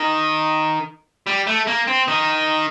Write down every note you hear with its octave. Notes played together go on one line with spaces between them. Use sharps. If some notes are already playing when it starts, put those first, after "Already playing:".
Already playing: D#3
G3
A3
A#3
C4
D#3